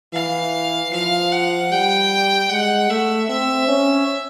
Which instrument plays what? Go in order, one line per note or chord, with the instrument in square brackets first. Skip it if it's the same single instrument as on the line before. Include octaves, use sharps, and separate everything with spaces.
[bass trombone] E3 [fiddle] F5
[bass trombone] F3 [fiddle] F5
[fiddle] F#5
[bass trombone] G3 [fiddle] G5
[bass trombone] G#3 [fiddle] F#5
[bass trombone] A3 [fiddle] E5
[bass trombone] C4 [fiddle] E5
[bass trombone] C#4